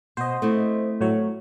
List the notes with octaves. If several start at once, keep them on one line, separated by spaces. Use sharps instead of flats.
B2 C5 D#5
A3 C4 E4
A2 F#3 C#5